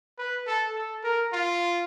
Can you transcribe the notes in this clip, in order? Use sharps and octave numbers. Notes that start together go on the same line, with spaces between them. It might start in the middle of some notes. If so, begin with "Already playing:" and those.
B4
A4
A4
A#4
F4